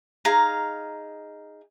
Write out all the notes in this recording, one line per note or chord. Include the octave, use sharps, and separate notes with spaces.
D#4 G#4 F5 A#5